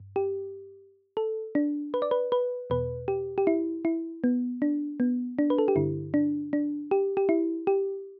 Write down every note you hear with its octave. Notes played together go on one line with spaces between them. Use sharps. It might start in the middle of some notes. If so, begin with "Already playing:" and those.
Already playing: G2
G4
A4
D4
B4
D5
B4
B4
E2 B2 B4
G4
G4
E4
E4
B3
D4
B3
D4
B4
A4
G4
G2 D3 E4
D4
D4
G4
G4
E4
G4